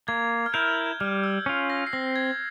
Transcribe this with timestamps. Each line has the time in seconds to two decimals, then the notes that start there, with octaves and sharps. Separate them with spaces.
0.08 A#3 G#6
0.46 F6
0.54 E4 A#4 G6
1.00 G3 F6
1.24 E6
1.46 C#4 F4
1.70 A#6
1.87 C7
1.93 C4 A#6
2.16 G#6